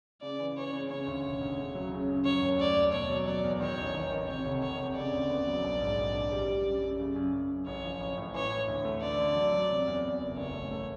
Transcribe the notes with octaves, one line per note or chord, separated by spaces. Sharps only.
C#3 D5
E3
E3 C#5
C#3
C#3 C#5
D2
E1
D2
C#3
F#3
C#3
F#2
F#3 C#5
D#2
A3 D5
D#2
B2 C#5
F#3
F#3 D5
E2
D#3 C#5
A1
D#3
D#3
C3 C#5
F1
F2 C#5
C3
C#3 D5
D2
B3
F#3
A#1
G#2
A#1
A#1
G3
G3
F#2
F#2
C#3
F#2
F#2
F#2
A1 C#5
F3
A1
A2
E3 C#5
E3
D2
A3
D3 D5
D3
F#3
F#3
C3
E2
E2
F#1
A1 C#5
A3
A3